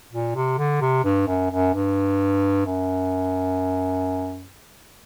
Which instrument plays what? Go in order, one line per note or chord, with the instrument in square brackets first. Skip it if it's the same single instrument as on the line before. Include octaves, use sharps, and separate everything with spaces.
[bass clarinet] A#2
C3
D3
C3
G2
F#2
F#2
G2
F#2